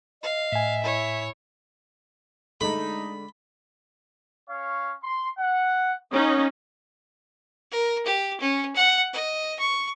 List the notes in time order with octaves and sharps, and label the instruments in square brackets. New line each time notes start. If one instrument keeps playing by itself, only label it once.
[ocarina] D#5 [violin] F5
[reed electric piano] A2 G#5 [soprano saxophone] E5
[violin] E4 C#5
[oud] D3 G#3 [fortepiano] A3 [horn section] D#4 [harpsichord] B5
[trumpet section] C#4 C#5 F5
C6
F#5
[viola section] C#4 D#4 [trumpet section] F#4 A#4 D#5
[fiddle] A#4
G4
C#4
F#5
D#5
C#6